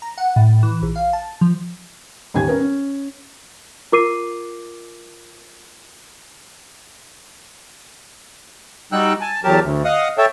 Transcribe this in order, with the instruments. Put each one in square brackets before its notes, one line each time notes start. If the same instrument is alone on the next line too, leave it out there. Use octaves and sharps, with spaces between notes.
[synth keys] A#5
F#5
A2
E3
A#1
F5
A5
F3
[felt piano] D#1 D#2 G#5 G#6
C#4 A#4 B4
C#4
[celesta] F4 A#4 D6 C7 D#7
[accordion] G3 D#4 F#4 G5 E6 F#6
G#5 A5
E2 F#3 G4 A#4 A5
D2
D#5 F5 F#5 D#6
A4 C#5 E5 G5 A5